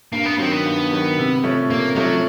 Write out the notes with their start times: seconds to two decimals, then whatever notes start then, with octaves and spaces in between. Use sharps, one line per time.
0.13 G2 A#3
0.25 B3
0.38 D#3 F#3 C4
0.52 B3
0.66 G2
0.92 D#3 F#3
1.18 C3
1.44 F3 A3 C#4
1.70 C3 A#3
1.96 F3 F#3 A3 C#4